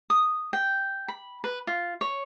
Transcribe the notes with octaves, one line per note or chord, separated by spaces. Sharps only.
D#6
G5
B5
B4
F4
C#5